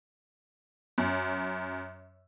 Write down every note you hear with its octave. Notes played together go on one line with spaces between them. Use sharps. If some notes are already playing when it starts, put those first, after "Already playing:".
F#2